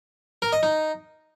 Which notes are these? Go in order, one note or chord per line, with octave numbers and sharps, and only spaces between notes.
A#4
D#5
D#4